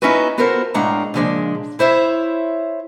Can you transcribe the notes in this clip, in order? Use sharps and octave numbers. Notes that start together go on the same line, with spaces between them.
B3 C#4 D#4 E4 F#4 B4
B3 F4 F#4 A4 A#4 C5
A2 G#3 D4 F5 F#5 A#5
A#2 C#3 F3 G#3 D4
E4 C5 C#5 E5